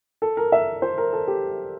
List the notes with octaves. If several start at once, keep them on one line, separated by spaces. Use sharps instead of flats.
A4
A#4
E5
C5
A#4
A4
G4